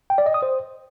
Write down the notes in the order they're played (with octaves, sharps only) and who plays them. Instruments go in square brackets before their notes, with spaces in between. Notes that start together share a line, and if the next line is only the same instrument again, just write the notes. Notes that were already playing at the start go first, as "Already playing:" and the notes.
[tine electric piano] G5
D5
D#5
D#6
C5